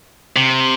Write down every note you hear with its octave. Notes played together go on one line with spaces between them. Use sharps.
C3